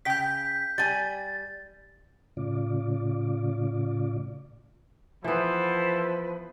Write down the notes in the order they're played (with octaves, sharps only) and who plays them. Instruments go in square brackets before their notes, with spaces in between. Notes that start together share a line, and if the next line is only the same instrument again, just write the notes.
[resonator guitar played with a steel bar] C#3 G5 [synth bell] G6 B6
[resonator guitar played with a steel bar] G3 G#5 [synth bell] A6
[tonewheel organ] A2 C#3 F4 D5
[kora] E3 B3 [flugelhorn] F3 [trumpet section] E4 A4 C5 [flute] B4